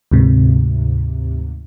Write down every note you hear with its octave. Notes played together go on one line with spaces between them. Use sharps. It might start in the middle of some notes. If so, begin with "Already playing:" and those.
D2 G#2 C3